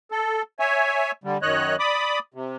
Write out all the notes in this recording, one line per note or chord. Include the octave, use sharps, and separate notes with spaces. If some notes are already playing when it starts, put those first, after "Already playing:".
A4
C#5 E5 G#5
D3 G3
F#2 D#3 C#5 D#5 F#6
D5 B5 D6 D#6
C3